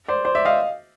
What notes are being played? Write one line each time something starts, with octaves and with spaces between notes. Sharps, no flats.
C5 D5
C5 D5
D5 E5
D#5 F5